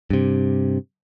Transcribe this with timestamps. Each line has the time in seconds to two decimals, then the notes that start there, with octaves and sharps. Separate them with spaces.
0.10 G2 C3